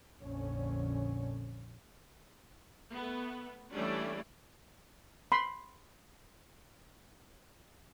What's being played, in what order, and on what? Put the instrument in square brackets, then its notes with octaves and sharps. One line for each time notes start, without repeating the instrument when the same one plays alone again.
[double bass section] A#1 F2 A#2 D3 C#4
[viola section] A3 B3
E3 G3 A3 C#4 D4 D5
[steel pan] B5 C6